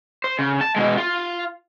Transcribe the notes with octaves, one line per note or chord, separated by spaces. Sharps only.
C5
C#3
A5
B2 G#3
F4